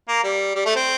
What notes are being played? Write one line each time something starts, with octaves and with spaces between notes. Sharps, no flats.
A#3
G3
G3
A3
C4